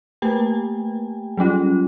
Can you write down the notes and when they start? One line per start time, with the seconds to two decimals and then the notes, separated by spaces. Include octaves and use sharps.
0.22 A3 A#3 G4 G5 G#5
1.37 F#3 G3 C#4 F4